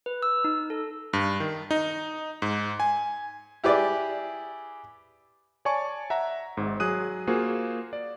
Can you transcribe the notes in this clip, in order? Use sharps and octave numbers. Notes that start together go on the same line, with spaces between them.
B4
E6
D#4
A4
G2
D#3
D#4
G#2
G#5
E4 G4 G#4 B4 D5
C#5 D5 G#5 A5 C#6
E5 F#5 A#5 A#6
G#1 G#2
F#3 G#4 D#6 F#6 D#7
A#3 F4 F#4 G#4 C5
D5